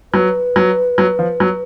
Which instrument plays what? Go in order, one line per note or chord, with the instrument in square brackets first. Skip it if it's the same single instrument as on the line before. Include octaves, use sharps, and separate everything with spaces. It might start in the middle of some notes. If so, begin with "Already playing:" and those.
[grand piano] F#3 [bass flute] B4
[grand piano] F#3
F#3
F3
F#3